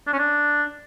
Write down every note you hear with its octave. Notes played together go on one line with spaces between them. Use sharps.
D4
C#4
D4